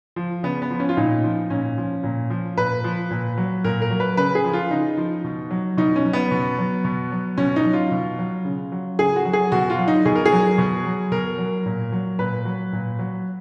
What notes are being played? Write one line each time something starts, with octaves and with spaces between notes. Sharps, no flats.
F3
C#3 B3
B3
F3
C#4
F4
A#2 D#4
F3
A#2 C#4
F3
A#2
F3
A#2 B4
F3
A#2
F#3
A#2 A#4
A#4
F#3
B4
C#3 B4
G#4
F3
F4
C#3 D#4
F3
B2
F#3
B2 D#4
C#4
F#3
B3
B2
F#3
B2
F#3
B2 C#4
D#4
F#3
F4
B2
F#3
C#3
F#3
C#3 G#4
F#4
F#3
G#4
B2 F#4
F4
F#3
D#4
B2 G#4
A#4
G#4
F#3
B2
F#3
B2 A#4
F#3
A#2
F#3
A#2 B4
F#3
A#2
F#3